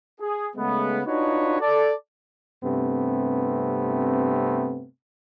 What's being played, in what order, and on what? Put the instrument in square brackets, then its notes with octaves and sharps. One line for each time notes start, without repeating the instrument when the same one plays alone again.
[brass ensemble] G#4
C#3 G#3 A3 B3
D4 D#4 F4 F#4 B4 C#5
A4 D5
[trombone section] G2 C3 A3 B3 C4